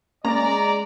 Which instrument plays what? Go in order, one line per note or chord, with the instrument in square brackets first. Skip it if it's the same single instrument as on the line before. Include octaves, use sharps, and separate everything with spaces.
[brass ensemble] G#3 D5 [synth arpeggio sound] A#3 C#4 [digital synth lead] A#5